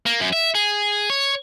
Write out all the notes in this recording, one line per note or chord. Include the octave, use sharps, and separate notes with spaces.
A#3
F#2
E5
G#4
C#5